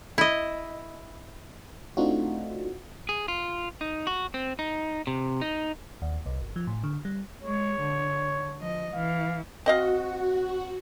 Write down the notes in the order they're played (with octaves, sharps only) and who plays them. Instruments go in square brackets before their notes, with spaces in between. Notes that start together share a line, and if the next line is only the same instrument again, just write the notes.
[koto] E4 D#5
[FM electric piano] A3 C4 D4 D#4 F4 F#4
[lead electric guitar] G#4
F4
D#4
F#4
C4
D#4
C3
D#4
[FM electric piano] D#2
C2
G1
F3
A2
D3
G3
[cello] G#3 [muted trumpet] C#5
[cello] D3
F3 D#5
[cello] E3 [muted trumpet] F5
[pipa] C4 D#5 F5 [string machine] F#4